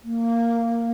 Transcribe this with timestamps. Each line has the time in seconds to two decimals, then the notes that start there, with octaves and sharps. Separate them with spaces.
0.04 A#3